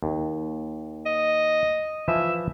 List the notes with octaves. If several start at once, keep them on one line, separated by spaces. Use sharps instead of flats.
D#2
D#5
E3 F3 E4 E5